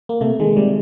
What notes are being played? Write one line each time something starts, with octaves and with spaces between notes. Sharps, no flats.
A#3
C3 A3
D#3 G#3
C3 G3